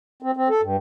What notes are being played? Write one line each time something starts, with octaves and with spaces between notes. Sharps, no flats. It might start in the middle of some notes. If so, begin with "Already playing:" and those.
C4
C4
A4
G2